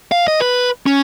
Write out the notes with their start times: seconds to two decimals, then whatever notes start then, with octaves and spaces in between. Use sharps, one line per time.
0.12 F5
0.28 D#5
0.40 B4
0.86 C#4